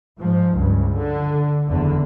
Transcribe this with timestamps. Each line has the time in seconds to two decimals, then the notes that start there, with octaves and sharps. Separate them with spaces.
0.20 G#2 F3
0.55 C#2 G2
0.94 D3
1.68 F#1 E2 D3